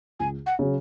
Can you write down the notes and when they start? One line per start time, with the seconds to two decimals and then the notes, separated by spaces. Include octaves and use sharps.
0.20 C#2 G#5
0.46 F#5
0.59 C#3 F#3